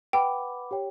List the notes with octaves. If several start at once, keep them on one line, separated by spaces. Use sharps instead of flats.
B4 F#5 G5 B5 D6
G4 C#5 G5